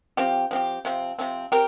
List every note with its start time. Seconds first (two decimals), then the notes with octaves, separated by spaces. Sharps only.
0.17 F3 C4 G4
0.51 F3 C4 G4
0.85 C3 F3 C4
1.19 C3 F3 C4
1.52 C4 G4 A#4